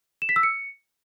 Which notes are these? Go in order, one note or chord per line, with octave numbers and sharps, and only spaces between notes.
E7
B6
E6
C#7